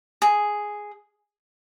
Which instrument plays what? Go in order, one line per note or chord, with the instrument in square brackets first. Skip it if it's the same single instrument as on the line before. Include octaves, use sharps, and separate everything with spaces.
[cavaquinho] G#4